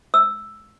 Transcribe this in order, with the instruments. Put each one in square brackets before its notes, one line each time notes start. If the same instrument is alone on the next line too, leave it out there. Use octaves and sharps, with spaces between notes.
[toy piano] E6